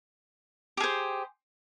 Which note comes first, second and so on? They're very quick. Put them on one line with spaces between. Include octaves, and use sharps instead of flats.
G4 G#4 C5